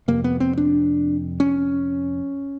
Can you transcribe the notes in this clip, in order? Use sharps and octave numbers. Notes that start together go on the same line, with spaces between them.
F2 C3 A#3
B3
C4
D4
C#4